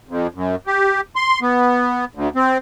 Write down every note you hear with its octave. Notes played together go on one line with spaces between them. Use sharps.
F2
F#2
G4
C6
B3
D2
C4